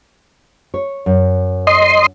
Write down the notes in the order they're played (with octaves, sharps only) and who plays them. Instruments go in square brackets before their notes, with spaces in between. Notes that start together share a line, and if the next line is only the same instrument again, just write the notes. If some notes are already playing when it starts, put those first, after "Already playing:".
[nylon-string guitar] C#5
F#2
[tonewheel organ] D#5 C6